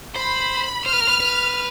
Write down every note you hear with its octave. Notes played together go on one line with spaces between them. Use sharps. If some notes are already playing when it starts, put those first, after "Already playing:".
C5 B5
C5 F6
B4
A#4
B4
B4